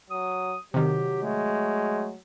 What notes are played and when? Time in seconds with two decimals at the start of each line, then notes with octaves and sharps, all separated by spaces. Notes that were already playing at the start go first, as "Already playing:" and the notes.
0.10 F#3 D#6
0.74 C3 D#3 F#3 G4
1.23 G#3 A3